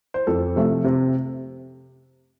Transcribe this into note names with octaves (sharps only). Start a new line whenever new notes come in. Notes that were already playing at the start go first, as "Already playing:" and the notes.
C5
F2 A4
C3 F3 A3
C3